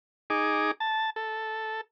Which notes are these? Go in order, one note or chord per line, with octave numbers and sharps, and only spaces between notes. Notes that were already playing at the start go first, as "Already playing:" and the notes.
D#4 G#4 D6
A5
A4